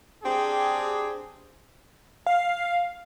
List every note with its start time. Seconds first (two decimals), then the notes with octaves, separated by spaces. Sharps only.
0.24 C4 D4 G4 G#4
2.26 F5